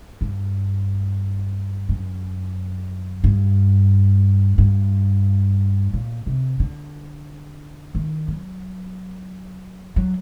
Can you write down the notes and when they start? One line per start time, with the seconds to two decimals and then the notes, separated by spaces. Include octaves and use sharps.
0.21 G2
1.89 F#2
3.24 G2
4.58 G2
5.93 A#2
6.27 C3
6.60 D3
7.95 D#3
8.28 F#3
9.96 F#3